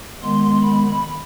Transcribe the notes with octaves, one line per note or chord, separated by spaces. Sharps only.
D#3 G#3 B3 C6
B5